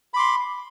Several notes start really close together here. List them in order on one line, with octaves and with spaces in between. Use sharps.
B5 D6 C6